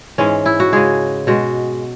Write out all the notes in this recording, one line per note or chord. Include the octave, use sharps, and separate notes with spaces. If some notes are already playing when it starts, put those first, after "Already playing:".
G#2 E3 G#3 C#4
E4
F#4
C#3 G#3 G#4
B2 G#3 F#4